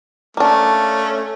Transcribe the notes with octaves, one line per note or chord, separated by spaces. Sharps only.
A3 A#3 C#4 D4